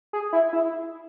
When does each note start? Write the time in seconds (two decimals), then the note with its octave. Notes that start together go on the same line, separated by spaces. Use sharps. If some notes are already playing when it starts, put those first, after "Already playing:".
0.13 G#4
0.33 E4
0.53 E4